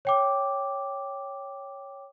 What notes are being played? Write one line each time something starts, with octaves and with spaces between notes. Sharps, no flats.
C#5 G5 D6